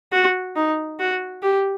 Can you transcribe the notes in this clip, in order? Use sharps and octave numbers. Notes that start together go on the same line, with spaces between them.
F#4
D#4
F#4
G4